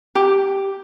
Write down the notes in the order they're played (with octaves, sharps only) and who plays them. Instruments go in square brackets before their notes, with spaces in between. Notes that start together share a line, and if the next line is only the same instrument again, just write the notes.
[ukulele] G4